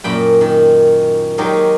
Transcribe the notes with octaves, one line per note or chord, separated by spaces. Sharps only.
F#2 A#2 G5 B5
D#3
D#3 F#3 G#3 D#4 G4 A#4